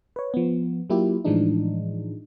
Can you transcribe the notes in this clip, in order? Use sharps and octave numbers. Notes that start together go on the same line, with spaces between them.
B4 C#5
F3 B3
F#3 A#3 E4 F4 G4
A2 E3 F3 G#3 D4 D#4